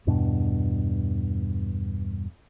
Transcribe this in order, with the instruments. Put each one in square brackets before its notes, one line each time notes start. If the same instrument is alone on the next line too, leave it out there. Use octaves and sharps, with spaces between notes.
[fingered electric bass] E2 G2 B2 D4